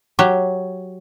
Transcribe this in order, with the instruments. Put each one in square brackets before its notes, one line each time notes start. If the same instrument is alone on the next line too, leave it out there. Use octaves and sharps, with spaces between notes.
[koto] F#3 G4